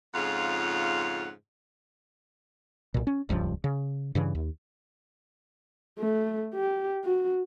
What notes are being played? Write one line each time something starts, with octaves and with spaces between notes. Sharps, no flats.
F2 G#2 C#3 F4 F5 F#5
B1 A#2
C#4
D#1 C#2 G2 F3
C#3
G2 C#3 E3
D#2
A3
G4
F#4